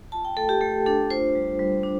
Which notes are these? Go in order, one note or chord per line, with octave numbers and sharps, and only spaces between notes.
F4 A5
G5
A3 A4
G4
A3 A4
D4 A4
F4 C5
G3
G3
D4